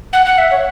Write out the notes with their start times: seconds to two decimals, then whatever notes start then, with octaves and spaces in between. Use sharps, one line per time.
0.13 F#5
0.26 F#5
0.38 E5
0.51 C#5